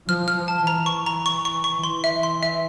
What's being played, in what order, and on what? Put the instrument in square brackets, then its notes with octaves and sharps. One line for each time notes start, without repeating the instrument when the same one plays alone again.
[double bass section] F3 [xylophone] F6
[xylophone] F6
[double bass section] F3
[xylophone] A5
[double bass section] E3 [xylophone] A#5
[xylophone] C#6
A#5
C#6
C#6
C#6
[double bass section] E3 [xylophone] C6
[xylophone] E5
C6
E5